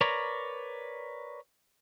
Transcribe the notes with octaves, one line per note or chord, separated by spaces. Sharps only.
A#4 B4 C#5 D5 A#5